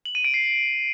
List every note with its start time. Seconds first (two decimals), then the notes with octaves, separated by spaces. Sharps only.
0.05 F#7
0.15 D#7
0.24 D7
0.34 C7